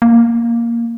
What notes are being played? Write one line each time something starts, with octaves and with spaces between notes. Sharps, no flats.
A#3